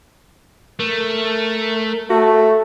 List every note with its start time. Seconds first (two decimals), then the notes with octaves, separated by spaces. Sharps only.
0.80 A3 A#4
2.10 A3 F#4